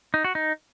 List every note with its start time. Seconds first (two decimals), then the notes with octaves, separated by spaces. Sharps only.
0.14 D#4
0.24 F#4
0.35 D#4